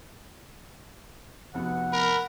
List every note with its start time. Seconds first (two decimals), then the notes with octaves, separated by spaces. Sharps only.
1.54 F1 B3 F#4 F#5
1.92 A#4 B5